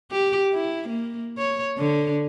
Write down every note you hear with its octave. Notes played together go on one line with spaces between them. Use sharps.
G4
E4
A#3
C#5
D3